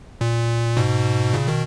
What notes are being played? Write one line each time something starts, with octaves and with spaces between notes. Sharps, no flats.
A#2
G#2 B2
A#2 C#3
B2 D#3